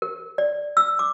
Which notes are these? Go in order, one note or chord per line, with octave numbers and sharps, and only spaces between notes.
A#4
D5
E6
D6